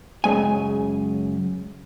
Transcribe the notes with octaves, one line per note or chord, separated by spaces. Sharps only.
F#2 C#3 G#3 G#5